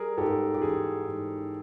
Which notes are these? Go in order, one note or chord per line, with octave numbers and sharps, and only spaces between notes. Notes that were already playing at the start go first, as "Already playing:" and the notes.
Already playing: G3 G#4 A#4
G#2 G4 A4
G4
E3 G#4
G#2